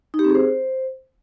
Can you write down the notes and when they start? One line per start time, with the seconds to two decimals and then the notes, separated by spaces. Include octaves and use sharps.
0.14 D#4
0.19 G4
0.24 C4
0.30 G#4
0.35 C5